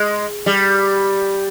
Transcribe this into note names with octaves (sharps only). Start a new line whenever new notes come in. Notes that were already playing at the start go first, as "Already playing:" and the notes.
Already playing: G#3
G3